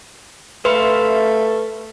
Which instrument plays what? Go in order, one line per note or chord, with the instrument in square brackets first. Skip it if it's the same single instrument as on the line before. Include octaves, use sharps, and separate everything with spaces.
[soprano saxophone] A3 [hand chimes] B4 [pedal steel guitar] E5 F5 C6